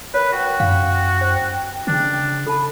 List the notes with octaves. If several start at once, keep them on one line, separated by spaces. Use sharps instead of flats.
A#4 B4 C#5
F#4 G5
F#2 F5
C5
C#3 D4
A4 A5 B5